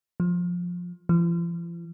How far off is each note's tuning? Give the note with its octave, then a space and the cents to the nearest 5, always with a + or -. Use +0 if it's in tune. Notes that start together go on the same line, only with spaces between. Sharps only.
F3 +15
F3 -45